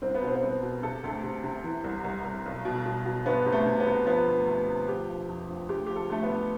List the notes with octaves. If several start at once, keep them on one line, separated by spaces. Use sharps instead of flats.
C2 C4
B3
B2
C4
B3
C2 C4
B2
C3 A4
D2 A4
C3
C3
E3
C2
C2
C2
B1
B2
B2
B2
G1 B3
C3
A3
C3
B3
C3
F3 B3
D2
D2
D2
F3 G4
F3
F2
F3
D2 G4
F3 G4
A4
D2 A3
B3
D2